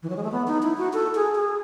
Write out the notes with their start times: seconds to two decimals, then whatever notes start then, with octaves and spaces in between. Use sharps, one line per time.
0.03 E3
0.10 F#3
0.17 G#3
0.24 A3
0.32 B3
0.47 D#4
0.63 E4
0.78 F#4
0.93 A4
1.15 G#4
1.35 G#4